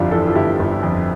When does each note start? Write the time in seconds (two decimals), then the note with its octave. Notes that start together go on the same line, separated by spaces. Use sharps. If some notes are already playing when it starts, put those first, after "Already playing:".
Already playing: G1 F2 D4 E4 F4 G4
0.11 E3 A4
0.27 F4 A4
0.35 G1 E4 G4
0.59 G1
0.83 F2